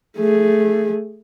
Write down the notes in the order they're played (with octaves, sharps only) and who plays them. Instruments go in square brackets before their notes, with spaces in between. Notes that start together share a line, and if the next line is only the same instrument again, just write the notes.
[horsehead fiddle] A3 G#4